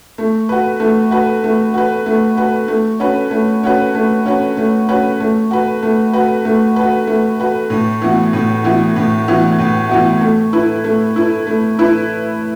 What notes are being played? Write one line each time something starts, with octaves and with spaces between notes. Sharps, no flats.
A3
F#4 B4
A3
F#4 B4
A3
F#4 B4
A3
F#4 B4
A3
C#4 F#4 B4
A3
C#4 F#4 B4
A3
C#4 F#4 B4
A3
C#4 F#4 B4
A3
F#4 B4
A3
F#4 B4
A3
F#4 B4
A3
F#4 B4
A2
E3 B3 F#4
A2
E3 B3 F#4
A2
E3 B3 F#4
A2
E3 B3 F#4
A3
E4 B4
A3
E4 B4
A3
E4 B4